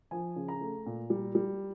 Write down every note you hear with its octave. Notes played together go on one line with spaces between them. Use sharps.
F3 G#5
C#3
A#5
A3
A#2
G3
G3